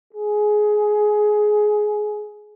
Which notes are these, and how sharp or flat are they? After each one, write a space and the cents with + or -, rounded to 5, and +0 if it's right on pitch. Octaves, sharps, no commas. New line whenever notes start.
G#4 +15